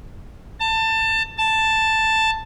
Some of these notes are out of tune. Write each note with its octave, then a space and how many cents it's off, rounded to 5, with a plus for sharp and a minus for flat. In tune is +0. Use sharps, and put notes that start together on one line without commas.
A5 +20
A5 +5